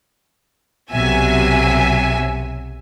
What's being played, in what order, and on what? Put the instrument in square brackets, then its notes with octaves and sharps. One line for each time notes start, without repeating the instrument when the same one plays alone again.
[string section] B1 C3 F#3 E5 G#5